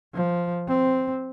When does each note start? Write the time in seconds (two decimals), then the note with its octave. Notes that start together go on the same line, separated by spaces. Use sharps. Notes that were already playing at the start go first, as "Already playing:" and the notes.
0.14 F3
0.68 C4